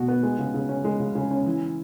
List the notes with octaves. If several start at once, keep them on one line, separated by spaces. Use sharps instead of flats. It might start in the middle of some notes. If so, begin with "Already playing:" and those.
Already playing: B2 F#4
B3
G#3
C#3
C#3
C#4
G#3
C#3
C#3
C#4
E3